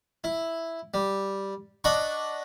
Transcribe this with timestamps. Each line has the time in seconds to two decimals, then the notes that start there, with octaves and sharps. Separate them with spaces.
0.24 E4
0.94 G3
1.84 D4 D#5 F#5 B5 C#6